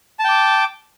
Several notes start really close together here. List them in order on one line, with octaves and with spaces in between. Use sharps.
A5 G5 D6